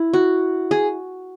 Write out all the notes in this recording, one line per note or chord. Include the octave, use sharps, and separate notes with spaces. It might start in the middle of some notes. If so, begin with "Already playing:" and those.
Already playing: E4
F#4
G#4